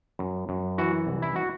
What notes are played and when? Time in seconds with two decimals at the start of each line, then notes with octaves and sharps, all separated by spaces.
0.19 F#2
0.49 F#2
0.78 E3 F#4
1.07 C2
1.22 E4
1.36 F#4